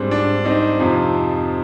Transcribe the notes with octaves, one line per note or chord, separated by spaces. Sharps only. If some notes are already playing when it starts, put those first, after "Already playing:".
Already playing: G#2 G3 C4 D4
D4
C4 D#4
F2 C3 F3